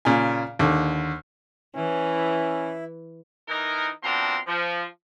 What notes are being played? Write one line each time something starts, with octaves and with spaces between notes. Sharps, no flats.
A#2 C#3 G#5
D#2 D3
E3 C#4 E4
E3 D#4 A#4
B2 F3 C4 D4 A#5 C6
F3